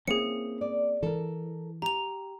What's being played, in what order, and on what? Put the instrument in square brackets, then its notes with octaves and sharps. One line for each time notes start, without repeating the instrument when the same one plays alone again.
[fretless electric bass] A#3 C4 C#4 [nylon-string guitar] E4 [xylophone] G#4 C#7
[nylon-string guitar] D5
[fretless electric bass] E3 [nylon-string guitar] A4 A#4
[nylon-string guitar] G4 [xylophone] A#5 F7